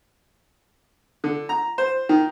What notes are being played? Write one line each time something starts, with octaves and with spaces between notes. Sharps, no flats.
D3
A#5
C5
D#3